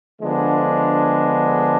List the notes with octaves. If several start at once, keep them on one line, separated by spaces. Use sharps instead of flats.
D3 F3 G#3 B3 D4